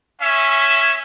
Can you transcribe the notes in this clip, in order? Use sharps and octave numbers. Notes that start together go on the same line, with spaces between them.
C#4 E5